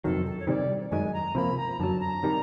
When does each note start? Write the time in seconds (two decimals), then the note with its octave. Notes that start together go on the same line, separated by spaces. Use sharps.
0.04 F2 C3 D#3 F#3 A4
0.26 A4
0.40 C#5
0.47 C3 D#3 G3 C4 D5
0.91 F#2 D#3 G#3 G#5
1.13 A#5
1.35 C3 F3 A#3 B5
1.57 A#5
1.80 F#2 D3 F#3 A5
2.00 A#5
2.23 C3 D#3 G3